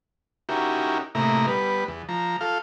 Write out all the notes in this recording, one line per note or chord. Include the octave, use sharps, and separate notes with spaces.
C#4 D#4 E4 F#4 G4 A#4
A2 C3 A#3 E4 D#5 A#5
G3 B3 B4
E2
F3 A#5
F4 A4 F5